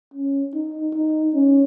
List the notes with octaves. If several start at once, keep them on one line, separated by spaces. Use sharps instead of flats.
C#4
D#4
D#4
C#4